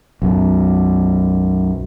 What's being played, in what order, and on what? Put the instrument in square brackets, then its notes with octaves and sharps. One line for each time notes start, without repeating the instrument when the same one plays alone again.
[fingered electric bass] B1 F#2 B2